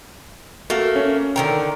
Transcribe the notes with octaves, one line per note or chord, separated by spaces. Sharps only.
A3 A#3 F#4
C#4
D3 D#3 A#4 G5